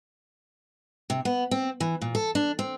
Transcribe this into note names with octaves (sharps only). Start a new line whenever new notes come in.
C3
B3
C4
E3
A#2
A4
D4
C4